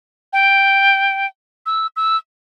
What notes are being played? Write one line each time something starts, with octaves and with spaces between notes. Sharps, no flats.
G5
E6
E6